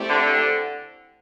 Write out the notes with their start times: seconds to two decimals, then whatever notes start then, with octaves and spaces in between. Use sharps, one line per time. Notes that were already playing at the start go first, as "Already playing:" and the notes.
Already playing: A3 C4 E4 G4 D5
0.09 D3